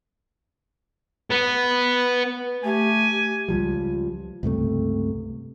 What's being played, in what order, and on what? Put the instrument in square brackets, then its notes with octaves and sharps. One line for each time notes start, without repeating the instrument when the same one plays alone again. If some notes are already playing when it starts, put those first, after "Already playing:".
[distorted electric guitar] B3
[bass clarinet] A3 [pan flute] G4 [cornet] G#5
[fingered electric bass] C#2 F3 G3
C#2 G2 C3 A3